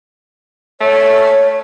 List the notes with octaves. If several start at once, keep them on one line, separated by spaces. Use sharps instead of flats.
A3 C#5